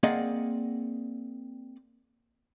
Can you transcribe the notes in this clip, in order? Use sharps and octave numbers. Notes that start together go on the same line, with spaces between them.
A#3 C4 G#4 D5 D#5 F#5